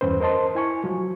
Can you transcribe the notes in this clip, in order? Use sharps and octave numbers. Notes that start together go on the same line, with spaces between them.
E2 G2 C#4 B4 C5
A#4 C5 D#5 A5 C6
E4 G#5 C#6
F3 F#3